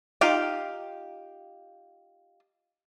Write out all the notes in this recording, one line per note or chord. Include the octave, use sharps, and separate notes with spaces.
D#4 F4 G4 F5 G5